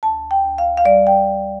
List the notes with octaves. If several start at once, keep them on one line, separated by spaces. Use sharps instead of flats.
D2 A5
G5
D2
F5
F5
G3 D5
G5